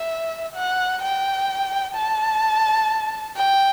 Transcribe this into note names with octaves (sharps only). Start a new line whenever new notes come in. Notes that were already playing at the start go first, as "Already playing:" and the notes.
Already playing: E5
F#5
G5
A5
G5